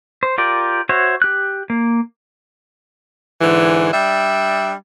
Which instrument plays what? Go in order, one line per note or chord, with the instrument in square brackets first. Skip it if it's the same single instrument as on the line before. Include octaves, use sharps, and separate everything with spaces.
[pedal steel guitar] C5
F4 G4 A#4 D5
F#4 C5 C#5 E5
G4 F#6
A#3
[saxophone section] G#2 D3 E3
G3 D4 E5